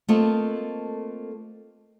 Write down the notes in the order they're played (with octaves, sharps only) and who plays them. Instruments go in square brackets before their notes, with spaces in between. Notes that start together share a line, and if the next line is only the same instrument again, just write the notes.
[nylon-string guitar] A3 A#3 C4 F4 A4 D#5